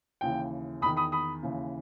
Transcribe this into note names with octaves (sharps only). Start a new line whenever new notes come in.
D#2 C#3 E3 G5
E2 D#3 B5 D#6
B5 D#6
B5 D#6
D#2 C#3 E3